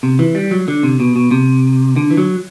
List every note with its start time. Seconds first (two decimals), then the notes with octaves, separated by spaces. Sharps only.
0.03 C3
0.19 E3
0.35 G3
0.51 F#3
0.68 D3
0.83 C3
1.00 B2
1.16 B2
1.31 C3
1.96 D3
2.11 E3
2.17 F#3